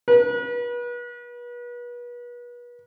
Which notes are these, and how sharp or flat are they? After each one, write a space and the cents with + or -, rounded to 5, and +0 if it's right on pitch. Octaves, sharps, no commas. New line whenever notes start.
B4 -35